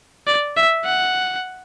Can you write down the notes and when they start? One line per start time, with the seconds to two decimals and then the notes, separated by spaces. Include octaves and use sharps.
0.27 D5
0.57 E5
0.85 F#5